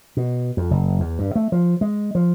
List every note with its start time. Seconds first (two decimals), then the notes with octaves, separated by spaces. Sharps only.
0.17 B2
0.57 F2
0.71 F#1
1.00 E2
1.19 G2
1.36 A3
1.52 F3
1.81 G#3
2.15 F3